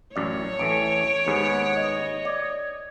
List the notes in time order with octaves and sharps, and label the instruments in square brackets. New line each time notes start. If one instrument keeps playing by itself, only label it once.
[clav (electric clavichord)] A1 F#2 D5 [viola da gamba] C#5
[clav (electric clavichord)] A1 E3 A3 [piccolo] D7
[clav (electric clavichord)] D#2 G#2 G#4 [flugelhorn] B3
[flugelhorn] D#5 [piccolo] G#6
[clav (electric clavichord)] D5 [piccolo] G#6